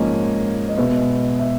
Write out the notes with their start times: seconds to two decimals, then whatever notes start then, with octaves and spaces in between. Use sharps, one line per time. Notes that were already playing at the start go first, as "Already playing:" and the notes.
Already playing: G#2 F3 A#3 C#4 D#5
0.69 D#5
0.78 B2 G#3 B3 E5
1.39 E5